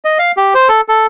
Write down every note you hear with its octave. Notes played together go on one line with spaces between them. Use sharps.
D#5
F5
G4
C5
A4
A4